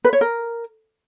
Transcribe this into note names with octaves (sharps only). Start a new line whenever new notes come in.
B4
C#5
A#4